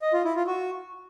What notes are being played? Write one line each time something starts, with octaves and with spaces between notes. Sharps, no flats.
D#5
F4
E4
F4
F#4